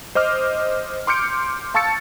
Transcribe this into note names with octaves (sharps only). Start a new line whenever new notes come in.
C5 D#5 D6 F6
C6 D6 F6 G6 C#7 D7
F5 A5 C#6 E6 A6 C#7